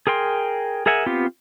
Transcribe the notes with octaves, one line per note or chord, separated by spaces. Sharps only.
G#4 A#4 G5 C6
G#4 A#4 E5 F#5 G#5
B3 C4 F4 G4